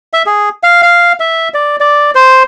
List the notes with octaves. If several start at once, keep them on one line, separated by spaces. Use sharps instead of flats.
E5
G#4
F5
F5
E5
D5
D5
C5